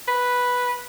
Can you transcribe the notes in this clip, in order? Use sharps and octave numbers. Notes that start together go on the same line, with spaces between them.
B4